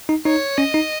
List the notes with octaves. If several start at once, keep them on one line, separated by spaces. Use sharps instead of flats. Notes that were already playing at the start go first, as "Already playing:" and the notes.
D#4
D#4 C#5
C#4 D#5
D#4